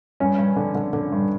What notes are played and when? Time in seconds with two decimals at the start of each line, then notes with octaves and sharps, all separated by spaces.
0.20 G2 C#4
0.38 G2
0.56 D3
0.75 D3
0.93 D3
1.12 G2